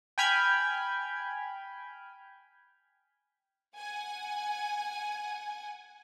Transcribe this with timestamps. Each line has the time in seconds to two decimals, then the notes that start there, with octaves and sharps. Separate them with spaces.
0.18 G5 G#5 B5 F6 G6 G#6
3.76 F#5 G#5